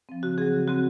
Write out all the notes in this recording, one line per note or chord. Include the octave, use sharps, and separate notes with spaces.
F3 C4
C#3 F#4
F#3 C4 G#4
C#3
F#3 C4 F#4